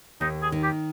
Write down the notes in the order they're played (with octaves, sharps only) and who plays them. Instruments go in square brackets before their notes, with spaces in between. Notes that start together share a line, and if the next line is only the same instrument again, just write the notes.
[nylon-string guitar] D#2 [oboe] D#4
[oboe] G#4
[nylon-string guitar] D#3
[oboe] G4